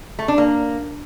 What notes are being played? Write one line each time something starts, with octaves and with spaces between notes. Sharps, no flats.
A3
D4
A#3